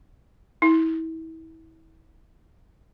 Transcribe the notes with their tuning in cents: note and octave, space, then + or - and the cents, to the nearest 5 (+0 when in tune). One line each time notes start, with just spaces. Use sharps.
E4 -30